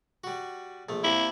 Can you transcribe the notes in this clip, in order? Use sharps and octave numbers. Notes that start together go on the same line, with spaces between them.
G3 F#4
A#1 A3
C3 A#3 E4